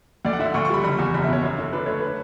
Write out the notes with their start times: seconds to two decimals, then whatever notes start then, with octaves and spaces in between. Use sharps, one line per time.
0.25 D2 D5
0.33 F#5
0.39 D3 E5
0.54 D2 C#6
0.65 C#6
0.70 G3 B5
0.84 F#1 B5
0.98 E2 C#6
1.14 F#1 B5
1.24 E5
1.29 B2 C#5
1.43 F#2
1.58 D3
1.73 D4 B4
1.86 A3 C#5
2.00 B4